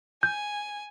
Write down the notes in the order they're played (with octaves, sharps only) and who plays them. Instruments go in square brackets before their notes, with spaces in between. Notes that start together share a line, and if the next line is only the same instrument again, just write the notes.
[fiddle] G#5 [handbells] G6